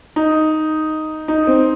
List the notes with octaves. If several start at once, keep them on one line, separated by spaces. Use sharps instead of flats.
D#4
D#4
C4